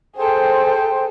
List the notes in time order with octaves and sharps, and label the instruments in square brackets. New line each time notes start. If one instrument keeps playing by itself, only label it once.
[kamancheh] G#4 A4 [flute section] C5 G5